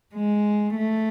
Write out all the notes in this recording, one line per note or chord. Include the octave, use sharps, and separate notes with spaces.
G#3
A3